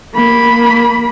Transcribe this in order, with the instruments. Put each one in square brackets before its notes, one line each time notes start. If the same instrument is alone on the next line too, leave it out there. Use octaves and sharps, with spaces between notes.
[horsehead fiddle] A#3 B5